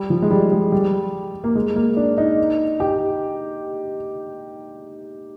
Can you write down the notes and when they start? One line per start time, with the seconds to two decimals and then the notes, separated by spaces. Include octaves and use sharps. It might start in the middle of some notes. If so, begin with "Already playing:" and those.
Already playing: G3
0.10 F3
0.22 G#3
0.31 G3
0.52 G#3
0.72 G3
1.44 A#3
1.55 G#3
1.76 A#3
1.97 D4
2.18 D#4
2.80 G4